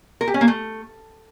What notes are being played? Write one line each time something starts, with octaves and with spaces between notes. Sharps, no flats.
A#4
G4
C#4
A#3
A3